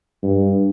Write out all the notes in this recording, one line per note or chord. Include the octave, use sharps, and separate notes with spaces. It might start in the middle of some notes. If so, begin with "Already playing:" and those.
G2